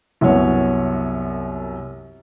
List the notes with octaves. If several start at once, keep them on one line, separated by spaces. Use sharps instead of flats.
C2 F#2 B3 C#5